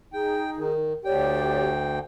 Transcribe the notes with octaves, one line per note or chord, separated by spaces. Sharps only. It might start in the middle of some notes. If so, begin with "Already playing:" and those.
D#4 G#4 G5
D#3
D2 G4 C#5 D5 G5